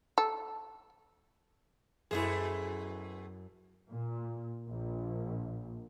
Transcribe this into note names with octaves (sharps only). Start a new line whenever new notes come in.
A4
F#2 B2 A3 E4 G#4 C5
A#2
A#1